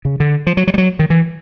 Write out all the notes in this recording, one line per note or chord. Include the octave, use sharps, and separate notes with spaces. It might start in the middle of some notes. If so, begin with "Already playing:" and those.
C#3
D3
F3
F#3
F#3
G3
F#3
D#3
E3